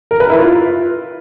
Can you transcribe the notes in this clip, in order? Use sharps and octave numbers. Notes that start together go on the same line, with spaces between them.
A#4
B4
E4
F4